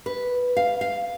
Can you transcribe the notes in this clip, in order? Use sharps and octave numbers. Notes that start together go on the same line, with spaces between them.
B4
F5
F5